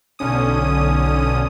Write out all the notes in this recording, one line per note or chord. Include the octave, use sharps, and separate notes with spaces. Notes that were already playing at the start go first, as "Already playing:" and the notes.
B1 D3 C#4 D#6